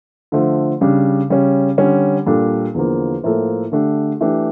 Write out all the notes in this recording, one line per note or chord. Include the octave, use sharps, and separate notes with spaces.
D3 F3 A3
C#3 G3 D4
C#3 G3 C#4
D3 G3 C#4
A#2 G3 D4 A4
E2 D3 F3 A#3
A2 F3 A#3 E4 A4
D3 A3 D4 G4
E3 A3 D4 G4